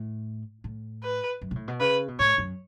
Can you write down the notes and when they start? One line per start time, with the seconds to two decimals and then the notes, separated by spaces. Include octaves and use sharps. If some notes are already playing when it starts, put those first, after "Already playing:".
Already playing: A2
0.64 A2
1.03 B4
1.41 F#2
1.51 B2
1.55 A2
1.68 B2
1.80 C#3 B4
2.08 B2
2.20 A2 C#5
2.38 F#2